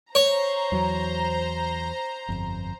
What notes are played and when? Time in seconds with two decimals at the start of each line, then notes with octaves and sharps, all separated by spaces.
0.15 C5 C#5 A#5
0.72 E2 F#3
2.28 G1 F2